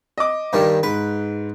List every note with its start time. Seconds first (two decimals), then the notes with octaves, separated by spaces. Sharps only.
0.18 D#5 D6
0.53 G2 D#3 G3
0.83 G#2 B4